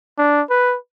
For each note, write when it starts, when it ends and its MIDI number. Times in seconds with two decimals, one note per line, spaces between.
0.18 0.42 62
0.50 0.76 71